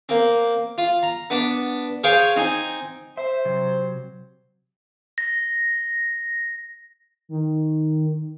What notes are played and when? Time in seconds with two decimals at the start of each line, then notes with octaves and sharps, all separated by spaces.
0.09 A#3 C4
0.78 F4
1.03 A#5
1.30 B3 D4
2.04 G#4 C5 C#5 F5 G5
2.36 C4 D#4 G#5
3.17 C5 E5
3.45 C3 F#3
5.18 A#6
7.29 D#3